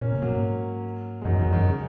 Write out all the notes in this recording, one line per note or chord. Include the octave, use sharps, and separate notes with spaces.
A#2 A#3 C#4
C3
A#2 F#3 A#3
G#2
G#3
F#2 D#3 F#3
F2
D#3 F#3
F2
F#2 D#3 F#3
C#3